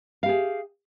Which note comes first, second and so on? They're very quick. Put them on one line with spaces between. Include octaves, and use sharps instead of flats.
F5 G4 G#4